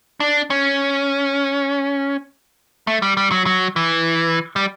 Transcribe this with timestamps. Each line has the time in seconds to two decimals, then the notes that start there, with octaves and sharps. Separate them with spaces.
0.20 D4
0.50 C#4
2.87 A3
3.02 G3
3.17 G3
3.32 F#3
3.46 F#3
3.76 E3
4.56 G3